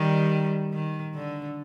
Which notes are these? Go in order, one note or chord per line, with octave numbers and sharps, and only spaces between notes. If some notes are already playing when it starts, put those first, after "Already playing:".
Already playing: D#3 G3
D#3
D3